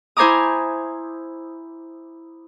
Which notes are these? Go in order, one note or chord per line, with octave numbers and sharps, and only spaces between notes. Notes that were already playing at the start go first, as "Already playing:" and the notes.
E4 C5 G#5 A#5 D6 D#6